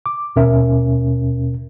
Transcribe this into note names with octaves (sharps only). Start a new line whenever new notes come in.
D6
D#2 B2 C#4 A#4 E5